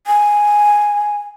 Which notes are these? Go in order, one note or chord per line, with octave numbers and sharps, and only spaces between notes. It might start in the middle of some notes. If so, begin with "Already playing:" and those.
G#5